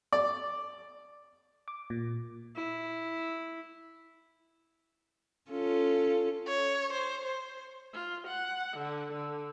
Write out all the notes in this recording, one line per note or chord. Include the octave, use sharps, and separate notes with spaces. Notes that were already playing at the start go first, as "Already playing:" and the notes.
D5
D6
A#2
E4
C#4 F4 A4
C#5
C5
C5
F4
F#5
D3
D3